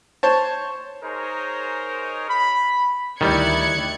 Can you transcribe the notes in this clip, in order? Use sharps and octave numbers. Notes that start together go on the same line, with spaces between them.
C5 C#5 A5
D#4 G#4 A#4 C5 C#5
B5
D2 D#3 G3 E4 D5 F#6 G#6 C#7